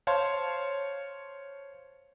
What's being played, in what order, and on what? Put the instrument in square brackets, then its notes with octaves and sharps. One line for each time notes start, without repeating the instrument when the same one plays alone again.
[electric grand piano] C5 C#5 F5 A5 C6